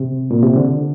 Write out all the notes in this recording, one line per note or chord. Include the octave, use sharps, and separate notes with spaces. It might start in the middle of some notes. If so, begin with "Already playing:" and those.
Already playing: C3
A#2
C3
D3